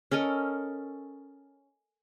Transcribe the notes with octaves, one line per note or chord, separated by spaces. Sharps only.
C#4 A4 A#4 D#5